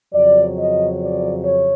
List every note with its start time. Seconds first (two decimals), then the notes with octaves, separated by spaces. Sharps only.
0.13 F2 C#3 F#3 D5
0.56 D#5
1.01 D5
1.44 C#5